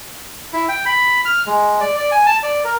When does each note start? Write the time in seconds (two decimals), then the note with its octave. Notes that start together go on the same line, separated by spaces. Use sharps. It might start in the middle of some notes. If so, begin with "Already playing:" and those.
0.53 E4
0.69 G5
0.86 B5
1.25 F6
1.46 G#3
1.80 D5
1.97 D5
2.12 G#5
2.26 A5
2.43 D5
2.64 A#4